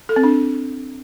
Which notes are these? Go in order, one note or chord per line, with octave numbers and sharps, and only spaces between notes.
A4
C4
D4